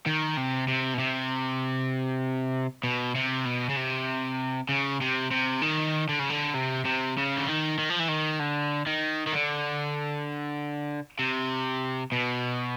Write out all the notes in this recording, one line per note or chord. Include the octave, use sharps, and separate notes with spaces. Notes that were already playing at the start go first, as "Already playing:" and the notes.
D#3
C3
C3
B2
C3
B2
C3
B2
C#3
C3
C#3
C3
C3
D#3
D3
C#3
D3
C3
C3
C#3
D3
D#3
D#3
F3
E3
D#3
D3
D#3
D#3
D3
C3
B2